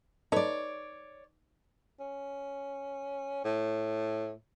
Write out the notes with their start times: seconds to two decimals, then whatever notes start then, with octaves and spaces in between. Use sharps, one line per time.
0.32 D#4 A4 B4 C#5 D5
2.00 C#4
3.45 A2